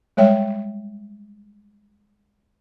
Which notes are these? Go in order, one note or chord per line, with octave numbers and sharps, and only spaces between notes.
G3 G#3 C#5 E5 G5